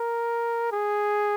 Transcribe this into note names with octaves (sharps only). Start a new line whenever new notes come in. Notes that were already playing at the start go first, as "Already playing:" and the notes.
Already playing: A#4
G#4